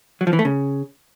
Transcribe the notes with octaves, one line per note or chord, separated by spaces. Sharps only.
F#3
F3
E3
A3
C#3